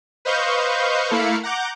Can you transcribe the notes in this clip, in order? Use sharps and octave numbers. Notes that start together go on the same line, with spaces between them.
B4 C5 D#5 F5 C#6 G6
A3 A#3 E4 F5 B5 C#7
F#5 A#5 D6 G6